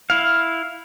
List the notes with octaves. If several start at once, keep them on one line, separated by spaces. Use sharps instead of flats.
E4 F5